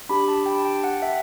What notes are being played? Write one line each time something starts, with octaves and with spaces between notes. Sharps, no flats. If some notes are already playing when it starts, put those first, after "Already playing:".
D4 G4 B5
A5
G5
A5
G5
F#5
E5